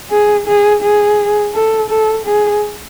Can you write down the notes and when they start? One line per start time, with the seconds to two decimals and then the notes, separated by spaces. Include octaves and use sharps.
0.11 G#4
0.47 G#4
0.82 G#4
1.54 A4
1.89 A4
2.26 G#4